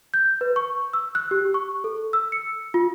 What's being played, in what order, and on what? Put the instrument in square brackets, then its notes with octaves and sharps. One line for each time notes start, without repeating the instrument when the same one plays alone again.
[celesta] G6
B4
C#6
E6
F#6
G4
C#6
A4
E6
C#7
F4